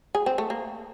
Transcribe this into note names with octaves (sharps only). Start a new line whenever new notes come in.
G#4
C4
A3
A#3